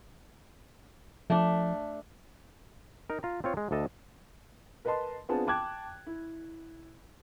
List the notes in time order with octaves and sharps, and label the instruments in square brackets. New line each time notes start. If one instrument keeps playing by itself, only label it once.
[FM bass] F3 [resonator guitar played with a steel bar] A3 D4
[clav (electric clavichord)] D#4 A#4
F4 A#5
C4 F4 C#5
G#3
D2 D4 A4 D#5 A5
[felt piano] A#4 B4 D#5 A5 C6
B3 C4 D4 F4 G#4 A5
G5 A5 D6 F#6 G#6
E4